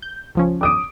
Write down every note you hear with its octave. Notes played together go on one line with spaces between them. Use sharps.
G6
C#2 F3 C#4
D6 D#6 D7